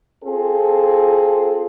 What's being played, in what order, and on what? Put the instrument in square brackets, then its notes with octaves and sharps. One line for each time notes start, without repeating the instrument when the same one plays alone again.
[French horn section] C4 F4 G#4 A4